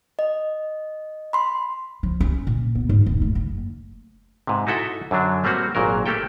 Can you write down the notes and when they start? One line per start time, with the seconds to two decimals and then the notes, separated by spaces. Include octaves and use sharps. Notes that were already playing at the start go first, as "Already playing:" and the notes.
0.19 D#5
1.33 B5 C6
2.03 F3
2.20 C#4
2.47 A#2
2.75 B3
2.89 G#2
3.06 D#1
3.22 A3
3.35 F#1
4.47 G#2 C3
4.67 D#4 E4 F#4 A4 E5
5.11 F#2 D3 F#3 D4
5.44 G3 A3 A#3 C4 F#4
5.75 G#1 A#2 F#3 A#4
6.06 A3 A#3 G4 A4 G5